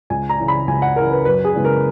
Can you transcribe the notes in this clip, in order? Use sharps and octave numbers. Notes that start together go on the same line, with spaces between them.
C#2 G#5
A#5
C#3 E3
B5
C#2 G#5
F#5
C#3 E3 A#4
B4
F#2 B4
G#4
C#3 E3 G#3 B3
A#4